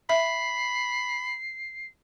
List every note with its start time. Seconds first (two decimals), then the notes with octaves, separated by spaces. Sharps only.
0.10 E5 B5 C7